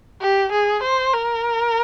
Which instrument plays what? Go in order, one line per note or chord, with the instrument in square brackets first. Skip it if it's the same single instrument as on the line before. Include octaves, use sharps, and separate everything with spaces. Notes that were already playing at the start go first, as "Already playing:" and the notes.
[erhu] G4
G#4
C5
A#4